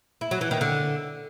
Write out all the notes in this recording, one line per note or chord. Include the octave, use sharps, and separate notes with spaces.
E4
F#3
E3
D#3
D3